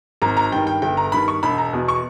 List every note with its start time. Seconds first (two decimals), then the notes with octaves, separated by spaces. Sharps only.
0.22 G#1 A#5
0.37 A#5
0.52 G2 D#3 G5
0.67 G5
0.82 G1 G5
0.97 A#5
1.12 G2 D#3 B5
1.28 C#6
1.43 E1 B5
1.58 A#5
1.73 E2 B2
1.88 C#6